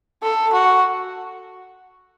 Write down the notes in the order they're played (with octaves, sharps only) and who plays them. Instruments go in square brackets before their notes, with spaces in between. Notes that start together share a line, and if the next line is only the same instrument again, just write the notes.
[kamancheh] A4
F#4